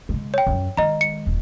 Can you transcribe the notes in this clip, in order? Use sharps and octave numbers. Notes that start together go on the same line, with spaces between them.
C#3 G#3
C#5 G5
F#2 F#3
D#3 G#3 D#5 A#5
C#7
D#1